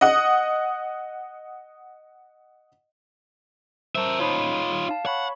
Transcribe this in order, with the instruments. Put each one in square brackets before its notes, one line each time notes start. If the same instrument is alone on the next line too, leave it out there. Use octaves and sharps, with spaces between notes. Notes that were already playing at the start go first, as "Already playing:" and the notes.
[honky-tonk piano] D#5 F#5 D#6
[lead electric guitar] A#4 E5 [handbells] C5 A5
[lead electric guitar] D#4 F4 [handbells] C#5 B5
[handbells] F5 A5
[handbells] C#5 B5 C#6 [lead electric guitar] F#5